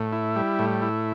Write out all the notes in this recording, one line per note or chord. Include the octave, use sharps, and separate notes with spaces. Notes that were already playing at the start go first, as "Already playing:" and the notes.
Already playing: A2
E4
G3
A2
E4